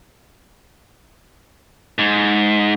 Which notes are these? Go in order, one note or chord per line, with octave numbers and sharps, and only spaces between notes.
G#2